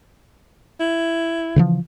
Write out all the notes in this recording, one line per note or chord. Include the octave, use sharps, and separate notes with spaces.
E4
C#3 E3 F3